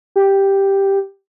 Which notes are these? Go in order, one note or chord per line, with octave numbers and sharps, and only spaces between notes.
G4